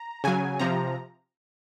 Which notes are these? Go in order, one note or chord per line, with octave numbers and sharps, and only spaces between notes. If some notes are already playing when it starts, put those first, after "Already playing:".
Already playing: A#5
C#3 F#3 G#5
C3 F3 A#5